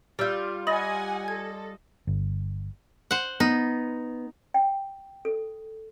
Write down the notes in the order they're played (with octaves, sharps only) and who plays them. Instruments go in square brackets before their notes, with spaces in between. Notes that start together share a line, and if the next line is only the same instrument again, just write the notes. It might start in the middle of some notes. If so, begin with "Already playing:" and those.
[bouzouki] G3 F4 [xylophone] D5 E6 G6
[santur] D#5 [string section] F#5 G#5 [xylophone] B5 A6 A#6
[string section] A4 [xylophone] G#6
[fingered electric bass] G1
[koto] C5 F#5
[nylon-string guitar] B3 [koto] D#4
[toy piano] G5
A4